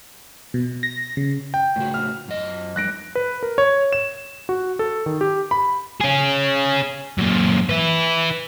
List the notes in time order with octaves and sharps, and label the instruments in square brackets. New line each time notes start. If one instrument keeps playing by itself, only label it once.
[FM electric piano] B2
A#6
C#3
[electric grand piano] G5
[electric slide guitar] A2 C#3 F#4
[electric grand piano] F6
[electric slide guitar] F#2 D#5
[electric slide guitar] F2 G3 [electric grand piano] F#6 A#6 D7
[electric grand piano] B4
A#4
C#5
E7
F#4
A4
D#3
G4
B5
[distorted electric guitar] C#4 G#4
F#2 A#2
E4 B4